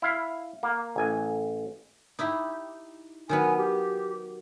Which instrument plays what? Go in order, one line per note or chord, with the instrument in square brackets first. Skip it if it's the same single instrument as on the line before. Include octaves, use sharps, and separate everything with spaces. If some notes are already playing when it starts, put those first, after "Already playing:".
[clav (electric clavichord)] E4 F5
A#3
A1 G#5
[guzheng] D#4 E4 G4
[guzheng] D#3 F#3 B3 [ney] G#5
[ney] G4